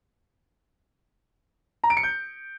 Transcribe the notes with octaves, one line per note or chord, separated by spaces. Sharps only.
A#5
D7
C#7
G6